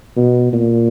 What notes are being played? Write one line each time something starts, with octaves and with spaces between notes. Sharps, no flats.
B2
A#2